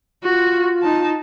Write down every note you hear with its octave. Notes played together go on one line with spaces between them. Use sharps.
F4 F#4
D#4 A5